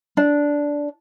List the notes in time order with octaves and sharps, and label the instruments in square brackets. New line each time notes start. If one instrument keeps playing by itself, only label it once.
[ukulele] D4